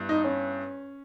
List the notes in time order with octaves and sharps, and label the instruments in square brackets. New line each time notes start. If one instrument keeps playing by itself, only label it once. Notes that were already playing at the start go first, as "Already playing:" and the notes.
Already playing: [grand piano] G2 G3 B3 E4
[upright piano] D#4
C#4